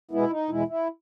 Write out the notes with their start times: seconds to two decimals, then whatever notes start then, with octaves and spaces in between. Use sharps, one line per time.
0.11 B2 G#3 B3 E4
0.30 D#4
0.49 E2 B2 G#3 E4
0.68 E4